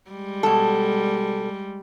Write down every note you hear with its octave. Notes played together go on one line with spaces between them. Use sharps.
G3 G#3
B2 A4